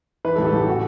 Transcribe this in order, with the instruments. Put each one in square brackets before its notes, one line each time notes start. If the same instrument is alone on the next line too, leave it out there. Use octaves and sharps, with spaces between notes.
[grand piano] E3 B4
A4
A1 G4
A4
A1 G4
F#4